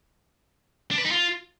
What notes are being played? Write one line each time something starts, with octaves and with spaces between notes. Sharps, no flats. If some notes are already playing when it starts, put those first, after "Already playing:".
D4
B4
D#4
F4